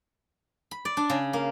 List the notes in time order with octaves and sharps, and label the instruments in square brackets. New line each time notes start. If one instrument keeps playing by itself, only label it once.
[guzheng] B5
D5
D4
C#3
A#3